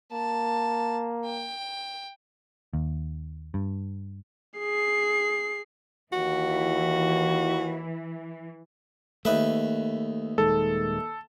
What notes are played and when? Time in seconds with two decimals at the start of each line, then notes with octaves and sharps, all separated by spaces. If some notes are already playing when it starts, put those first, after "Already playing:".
0.12 A#3 A5
1.25 G5
2.73 D#2
3.54 G2
4.59 G#4 C7
6.13 D#2 E3 F#4
9.25 D#2 A3 B4 E5
10.38 D#1 D#3 G#3 A4